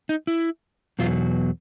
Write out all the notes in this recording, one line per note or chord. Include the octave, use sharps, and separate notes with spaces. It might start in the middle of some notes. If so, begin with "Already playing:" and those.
D#4
E4
E2 B2 F#3 F4